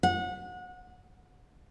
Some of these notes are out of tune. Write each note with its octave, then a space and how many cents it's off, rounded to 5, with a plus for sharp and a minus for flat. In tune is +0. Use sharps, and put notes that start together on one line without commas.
F#5 -30